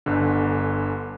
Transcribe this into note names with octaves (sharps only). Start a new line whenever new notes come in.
G1 D3